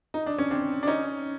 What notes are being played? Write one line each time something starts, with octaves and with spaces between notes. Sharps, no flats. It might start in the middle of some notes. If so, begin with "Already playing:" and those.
D#4
D4
C#4
C4 D4
D4
C#4 D#4